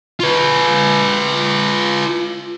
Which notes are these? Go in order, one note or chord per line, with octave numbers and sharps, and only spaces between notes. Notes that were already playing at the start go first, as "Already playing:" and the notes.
F4 B4